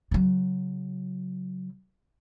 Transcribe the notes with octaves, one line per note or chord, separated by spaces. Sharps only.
C#3 F#3